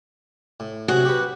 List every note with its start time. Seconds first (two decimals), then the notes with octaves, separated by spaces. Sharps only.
0.60 A2
0.88 C3 F#3 F#4 G#4 F#6
1.05 G4 B4